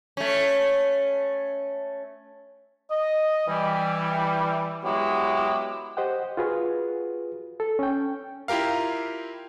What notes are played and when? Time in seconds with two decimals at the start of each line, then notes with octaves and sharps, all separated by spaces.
0.17 A3 C#4
2.90 D#5
3.48 E3 G3
4.84 F#3 G#3 B3 E4 F#4 G4
5.97 G4 C5 D#5 F#5 G5
6.37 F4 F#4 G#4 B4
7.60 A4
7.79 C#4 G5
8.48 E4 F4 G4 A#4 F5